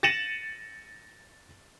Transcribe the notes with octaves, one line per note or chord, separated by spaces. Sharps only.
A6 A#6 C#7 D#7 E7 F#7